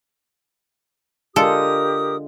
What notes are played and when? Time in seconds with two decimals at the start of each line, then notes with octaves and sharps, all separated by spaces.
1.36 D3 G#3 F4 G4 A4 A#4 D#6